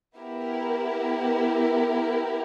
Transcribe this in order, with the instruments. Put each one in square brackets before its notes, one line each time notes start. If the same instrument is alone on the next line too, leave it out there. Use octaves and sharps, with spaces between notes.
[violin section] B3 E4 G4 A#4